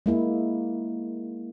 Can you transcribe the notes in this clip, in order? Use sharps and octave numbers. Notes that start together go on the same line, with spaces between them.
G#3 A#3 E4